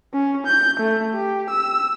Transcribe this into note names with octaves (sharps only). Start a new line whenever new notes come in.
C#4
G6
A3
G4
E6